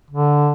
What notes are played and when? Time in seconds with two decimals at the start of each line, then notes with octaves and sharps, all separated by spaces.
0.10 D3